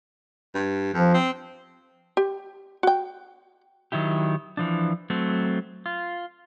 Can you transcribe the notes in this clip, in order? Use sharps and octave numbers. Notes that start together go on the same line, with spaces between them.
G2
F2 F3
C4
G4
F#4 G5
D#3 F#3 E4 G4
E3 F3 D4
F#3 A3 C4
F4